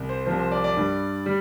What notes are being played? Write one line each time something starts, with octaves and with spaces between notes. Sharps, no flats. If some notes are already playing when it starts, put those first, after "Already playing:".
Already playing: C2
C5
C2 C3 F3 C5
C5
D5
D5
G2 G3
G3